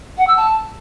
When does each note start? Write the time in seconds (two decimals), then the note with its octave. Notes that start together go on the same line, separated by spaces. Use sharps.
0.18 F#5
0.27 E6
0.37 A5